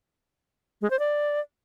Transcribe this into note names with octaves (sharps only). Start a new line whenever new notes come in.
G#3
C5
D5